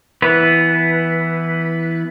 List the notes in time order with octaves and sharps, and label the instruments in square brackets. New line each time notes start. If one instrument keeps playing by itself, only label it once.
[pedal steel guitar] E3 B3 B4